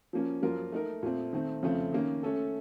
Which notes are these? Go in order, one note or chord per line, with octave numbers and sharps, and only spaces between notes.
F3 A#3 C#4
F#2 F3 A#3 F4 A#4
A3 D#4 A#4
A#2 A3 C4
D#3 A3 C4
F2 C#3 A3 C4
D#3 A#3 C#4
A3 C#4 A4